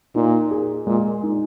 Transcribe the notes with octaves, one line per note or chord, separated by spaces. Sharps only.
A#2 D#4
G#4
A#2 G#3
D#4